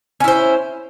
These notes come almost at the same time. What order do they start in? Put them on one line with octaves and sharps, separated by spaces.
C#4 E4 C5